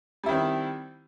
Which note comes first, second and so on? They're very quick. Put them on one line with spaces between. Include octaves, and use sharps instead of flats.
G3 E4 D#3 C4